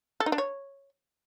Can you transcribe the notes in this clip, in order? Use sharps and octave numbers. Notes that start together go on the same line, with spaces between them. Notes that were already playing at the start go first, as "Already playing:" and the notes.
A4
D#4
D4
C#5